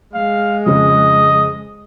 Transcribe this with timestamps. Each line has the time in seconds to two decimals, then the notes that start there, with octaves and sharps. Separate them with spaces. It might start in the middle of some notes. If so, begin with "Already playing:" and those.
0.14 G#3 F5
0.66 F2 C#3 F3 D#5